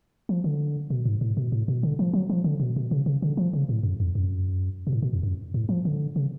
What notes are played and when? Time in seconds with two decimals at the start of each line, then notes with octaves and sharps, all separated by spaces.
0.29 F3
0.44 D3
0.90 B2
1.05 G#2
1.21 A2
1.37 B2
1.52 A2
1.68 B2
1.83 D3
1.99 F3
2.13 F#3
2.30 F3
2.44 D3
2.60 B2
2.76 B2
2.91 C#3
3.06 C#3
3.22 D3
3.37 F3
3.53 C#3
3.69 A2
3.83 F#2
4.00 F2
4.15 F#2
4.87 B2
4.93 A2
5.02 B2
5.13 F2
5.23 F#2
5.54 A2
5.69 F3
5.85 D3
6.16 C#3